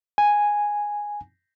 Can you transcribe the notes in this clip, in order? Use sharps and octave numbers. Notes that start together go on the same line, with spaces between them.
G#5